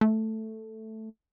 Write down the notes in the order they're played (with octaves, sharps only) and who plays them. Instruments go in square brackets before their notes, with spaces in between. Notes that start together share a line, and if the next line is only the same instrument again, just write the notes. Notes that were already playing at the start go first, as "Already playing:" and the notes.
[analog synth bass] A3